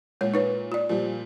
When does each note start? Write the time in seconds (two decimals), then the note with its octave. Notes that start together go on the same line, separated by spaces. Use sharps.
0.21 A#2 G#3 C#5
0.34 D#4 B4 C#5
0.72 F4 D5
0.89 A#2 F3 G3